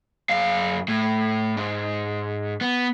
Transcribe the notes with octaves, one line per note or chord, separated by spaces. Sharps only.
F#2 F5
A2
G#2
B3